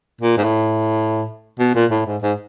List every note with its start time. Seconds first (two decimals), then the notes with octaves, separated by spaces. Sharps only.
0.21 A#2
0.37 G#2
0.44 A2
1.59 B2
1.75 A#2
1.91 A2
2.06 G#2
2.22 G#2